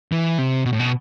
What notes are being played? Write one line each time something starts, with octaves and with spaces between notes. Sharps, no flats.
E3
C3
B2
A2
B2